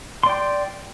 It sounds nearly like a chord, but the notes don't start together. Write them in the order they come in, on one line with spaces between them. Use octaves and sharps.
C6 D5 G5